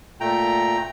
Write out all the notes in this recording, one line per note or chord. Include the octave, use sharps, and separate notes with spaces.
A#2 A3 G5 A#5